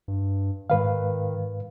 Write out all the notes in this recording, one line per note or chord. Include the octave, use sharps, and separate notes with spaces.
G2
G#2 D#3 B4 F5